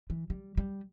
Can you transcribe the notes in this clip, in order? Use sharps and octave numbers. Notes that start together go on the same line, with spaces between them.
E3
G3
G3